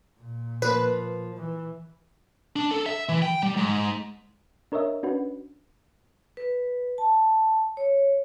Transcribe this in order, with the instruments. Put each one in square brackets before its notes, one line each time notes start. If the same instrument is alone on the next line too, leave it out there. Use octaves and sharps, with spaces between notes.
[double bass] A#2
[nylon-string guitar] F3 A#3 [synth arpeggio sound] B4
[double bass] E3
[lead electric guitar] D4
A4
E5
E3
G5
G3
G#2
[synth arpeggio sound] D4 A#4 C#5 D#5 E5
C#4 D4 F#4 B4
[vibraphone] B4
A5
C#5